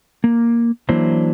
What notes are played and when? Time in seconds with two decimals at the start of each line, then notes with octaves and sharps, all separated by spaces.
0.24 A#3
0.89 E3 F#3 A#3 D4 E4 C5